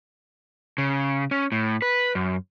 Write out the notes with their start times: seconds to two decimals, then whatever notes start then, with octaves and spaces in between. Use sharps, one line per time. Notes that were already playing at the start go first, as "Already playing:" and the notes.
0.78 C#3
1.31 C#4
1.52 A2
1.82 B4
2.15 F#2